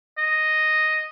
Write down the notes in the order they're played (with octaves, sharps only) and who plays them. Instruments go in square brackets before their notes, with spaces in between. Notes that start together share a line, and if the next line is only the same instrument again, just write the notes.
[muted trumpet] D#5